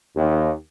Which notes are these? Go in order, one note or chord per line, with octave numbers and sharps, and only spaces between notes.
D#2